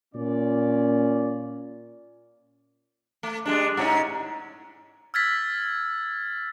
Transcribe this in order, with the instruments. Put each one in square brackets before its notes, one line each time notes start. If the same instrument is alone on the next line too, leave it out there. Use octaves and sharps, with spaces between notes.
[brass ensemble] A#2 C#4 D5
[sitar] A3
G3 G#3 D4
G#2 C#4 D#4
[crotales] E6 F6 G#6 A6 B6